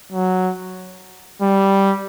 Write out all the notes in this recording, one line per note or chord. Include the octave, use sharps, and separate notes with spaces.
F#3
G3